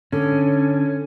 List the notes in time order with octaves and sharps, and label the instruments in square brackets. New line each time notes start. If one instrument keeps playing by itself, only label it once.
[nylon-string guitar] D3 [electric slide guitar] C#4